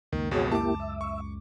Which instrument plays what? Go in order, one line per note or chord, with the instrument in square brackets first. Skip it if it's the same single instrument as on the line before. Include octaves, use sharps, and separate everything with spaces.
[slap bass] C#2 F#2 [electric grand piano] D#3 [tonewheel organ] A#3
[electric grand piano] B1 F2 B2 [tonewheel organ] F#4 G#4 C#5
[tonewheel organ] A#3 E4 G4 [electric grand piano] A5 D6
[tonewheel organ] E5
[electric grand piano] C#6